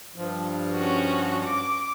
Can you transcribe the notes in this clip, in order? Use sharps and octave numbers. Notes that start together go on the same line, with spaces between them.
G2 F3
C#4 F#4
D6